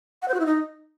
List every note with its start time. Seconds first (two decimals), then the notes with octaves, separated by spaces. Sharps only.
0.22 F#5
0.28 C5
0.34 F#4
0.40 E4
0.46 D#4